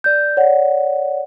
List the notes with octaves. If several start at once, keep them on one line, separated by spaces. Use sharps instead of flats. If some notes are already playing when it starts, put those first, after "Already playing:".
D5 G6
C#5 D5 F#5